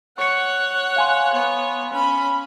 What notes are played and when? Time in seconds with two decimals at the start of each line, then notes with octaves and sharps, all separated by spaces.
0.18 C#5 F#5 C#6 C#7
0.96 F5 G#5 C6
1.33 B3 C#5
1.92 C#4 B5